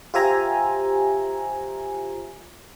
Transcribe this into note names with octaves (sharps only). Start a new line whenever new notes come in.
F4 G4 C5 E5 G#5 A#5